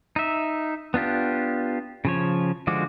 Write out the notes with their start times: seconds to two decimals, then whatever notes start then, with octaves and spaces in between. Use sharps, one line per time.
0.16 D#4 E5
0.94 B3 D4 F4 G4
2.05 C#3 F3 C#5
2.67 D3 F3 G#3 F#4 D6